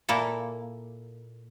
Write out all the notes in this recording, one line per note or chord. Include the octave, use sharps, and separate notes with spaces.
A#2 A#3 E4 A4